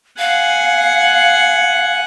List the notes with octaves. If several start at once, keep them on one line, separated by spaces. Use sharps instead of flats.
F5 F#5 G#5